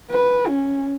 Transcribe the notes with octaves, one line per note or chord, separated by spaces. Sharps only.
B4
C#4